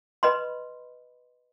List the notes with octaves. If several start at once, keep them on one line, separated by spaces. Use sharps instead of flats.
B4 D#5 B5 C6